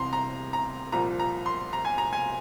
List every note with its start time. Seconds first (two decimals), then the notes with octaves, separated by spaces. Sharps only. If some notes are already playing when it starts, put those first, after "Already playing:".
Already playing: C2 C3 E3 A#5 C6
0.13 A#5
0.53 A#5
0.92 C2 A#2 F3 A#5
1.20 A#5
1.46 C6
1.73 A#5
1.85 G#5
1.98 A#5
2.13 G#5